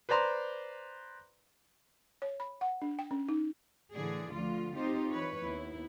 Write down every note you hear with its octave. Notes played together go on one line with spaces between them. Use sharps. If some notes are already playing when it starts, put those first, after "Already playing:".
B4 C5 D5 A#5 C6
C#5
B5
F#5
D4
G5
C#4
D#4
A2 D3 E3 G#4 D5
D2 D3 F3 F4
C4 D#4 F4 G4 C5
E3 B4 C#5
D#2 B3 E4